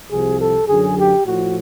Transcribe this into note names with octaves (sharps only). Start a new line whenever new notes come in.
C2 C3 F3 G#4
A4
F#2 D3 F#3 G#4
G4
A2 F3 F#4